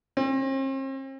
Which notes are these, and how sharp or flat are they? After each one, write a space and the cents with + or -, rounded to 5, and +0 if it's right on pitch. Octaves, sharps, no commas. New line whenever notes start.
C4 +45